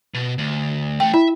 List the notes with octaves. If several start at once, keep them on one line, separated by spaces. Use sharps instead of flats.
B2
D2
E3 A3 G5
E4 E5